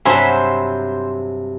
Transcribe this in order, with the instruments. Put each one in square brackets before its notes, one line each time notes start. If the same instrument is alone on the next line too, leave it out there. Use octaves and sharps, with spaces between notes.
[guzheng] G2 C3 F#3 [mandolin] C5 B5 [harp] E5 G#5 A#5